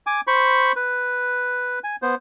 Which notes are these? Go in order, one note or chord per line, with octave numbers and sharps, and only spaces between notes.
G#5 D6
C5 B5 C#6
B4
G#5
B3 C5